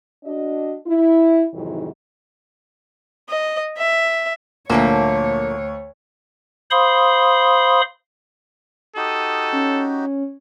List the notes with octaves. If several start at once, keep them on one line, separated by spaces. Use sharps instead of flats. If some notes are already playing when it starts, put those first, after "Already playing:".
D4 F#4 D#5
E4
F2 G#2 C3 D#3 E3 F#3
D#5
E5
D2 A#2 F3 A3 A#3 C#5
C5 F5 B5 C6 D#6
D#4 F#4 G4 A4 D#6
C#4